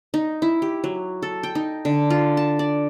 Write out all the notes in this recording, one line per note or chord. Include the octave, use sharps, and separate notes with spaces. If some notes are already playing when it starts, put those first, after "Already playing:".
D#4
E4
G4
F#3
A4
G5
D#4
D3
F4
A5
D5